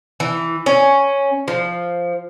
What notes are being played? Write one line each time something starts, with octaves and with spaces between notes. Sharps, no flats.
E3
C#4
F3